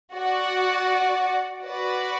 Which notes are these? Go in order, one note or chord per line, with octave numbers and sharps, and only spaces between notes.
F#4 D5 F#5
F#4 B4 D5